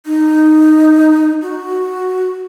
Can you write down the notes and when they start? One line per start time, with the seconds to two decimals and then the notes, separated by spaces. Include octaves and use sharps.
0.06 D#4
1.42 F#4